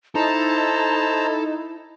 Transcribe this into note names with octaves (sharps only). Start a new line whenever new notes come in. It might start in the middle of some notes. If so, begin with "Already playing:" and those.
D#4 E4 A4 C5 A5 A#5